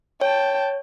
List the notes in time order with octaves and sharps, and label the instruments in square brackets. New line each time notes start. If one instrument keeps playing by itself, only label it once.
[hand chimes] C#5 [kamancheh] G5 A5